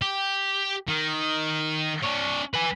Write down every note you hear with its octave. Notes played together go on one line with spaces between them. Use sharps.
G4
D#3
D4 C#5
B4 G#5